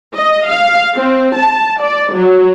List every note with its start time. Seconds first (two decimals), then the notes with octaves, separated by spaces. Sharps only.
0.14 D#5
0.48 F5
0.96 C4
1.36 A5
1.81 D5
2.15 F#3